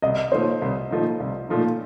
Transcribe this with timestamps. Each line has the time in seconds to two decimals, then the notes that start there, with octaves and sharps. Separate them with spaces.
0.02 C2 D#5
0.32 A#2 F3 A3 D#4 C5
0.62 C2
0.91 A#2 F3 A3 D#4
1.20 C2
1.49 A#2 F3 A3 D#4